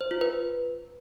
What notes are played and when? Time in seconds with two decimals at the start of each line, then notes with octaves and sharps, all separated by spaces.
0.01 C5
0.11 F4
0.21 B4